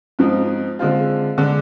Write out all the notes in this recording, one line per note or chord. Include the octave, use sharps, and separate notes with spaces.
G#2 F3 C4 D#4
D3 G#3 C4 F4
D3 G#3 D4